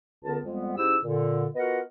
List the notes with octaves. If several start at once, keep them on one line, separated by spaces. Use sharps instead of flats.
C#2 D3 B3 A#4 A5
F2 G3 G#3 B3
G#2 C#4 E4 G4 E6
A#2 D3
B3 F4 F#4 A#4 D#5 F#5